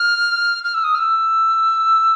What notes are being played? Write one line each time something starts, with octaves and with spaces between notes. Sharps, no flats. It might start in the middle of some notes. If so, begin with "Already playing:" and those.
Already playing: F6
F6
E6
D#6
F6
E6